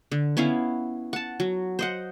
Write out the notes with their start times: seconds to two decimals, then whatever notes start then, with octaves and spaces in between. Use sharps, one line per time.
0.12 D3
0.37 B3 C#4 E4 F5
1.13 F#5 A5
1.40 F#3
1.79 C5 D#5 F#5